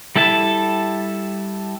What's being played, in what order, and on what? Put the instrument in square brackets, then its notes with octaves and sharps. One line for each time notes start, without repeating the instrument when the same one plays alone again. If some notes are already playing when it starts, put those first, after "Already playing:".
[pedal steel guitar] G3 E4 A4 E5 A5